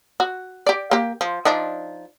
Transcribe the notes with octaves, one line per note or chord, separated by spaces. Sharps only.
F#4
G4 D5
A#3 G4
F3
F3 D4 D#4